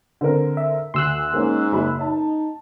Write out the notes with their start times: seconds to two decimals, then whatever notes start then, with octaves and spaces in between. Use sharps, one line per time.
0.21 D3 C4 A#4
0.57 E5
0.94 D2 C6 E6 F#6
1.34 G#2 A#3 C#4
1.72 F#1 F#2 B5
2.01 D#4 A5